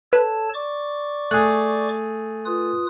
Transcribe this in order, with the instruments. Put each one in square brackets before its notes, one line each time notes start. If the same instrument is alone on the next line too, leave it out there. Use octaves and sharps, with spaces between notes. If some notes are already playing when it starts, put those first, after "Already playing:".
[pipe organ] A4 C#5 A5 [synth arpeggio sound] B4
[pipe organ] D5 C#6 D6
[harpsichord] A3 G#4 [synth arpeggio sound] F#6
[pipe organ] F4 B4 D#6